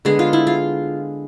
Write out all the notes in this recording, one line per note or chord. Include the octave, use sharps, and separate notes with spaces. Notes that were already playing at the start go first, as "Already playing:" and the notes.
D3 G#3 B3 G#4
F4
E4
F4